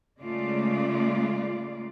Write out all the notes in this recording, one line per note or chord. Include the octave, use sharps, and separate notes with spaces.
C#3 G#3 A3 F4 D5